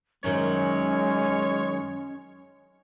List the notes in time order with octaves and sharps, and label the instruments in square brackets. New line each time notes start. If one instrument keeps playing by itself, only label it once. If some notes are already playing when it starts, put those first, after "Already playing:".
[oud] F#2 D#3 F#3 [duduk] G#3 [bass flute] C#4 [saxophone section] C#5